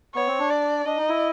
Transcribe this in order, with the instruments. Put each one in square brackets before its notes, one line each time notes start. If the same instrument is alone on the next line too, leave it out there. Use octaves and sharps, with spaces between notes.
[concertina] B3 [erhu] C#5
[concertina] C4
D4
[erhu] D5
[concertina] D4 [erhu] D#5
[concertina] D#4
E4